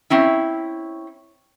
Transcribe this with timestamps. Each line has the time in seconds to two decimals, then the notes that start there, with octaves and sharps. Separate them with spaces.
0.10 C4 C#4 E4